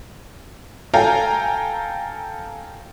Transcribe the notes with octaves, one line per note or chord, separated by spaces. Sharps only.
A4 F5 G5 G#5 A#5